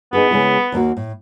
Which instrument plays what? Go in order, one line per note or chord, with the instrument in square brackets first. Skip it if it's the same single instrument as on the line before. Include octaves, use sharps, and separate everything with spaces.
[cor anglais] B3 [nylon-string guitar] D#4 G#4 B4
[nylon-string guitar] C#3 G#3 E4
D#2 A#3 F#4
A2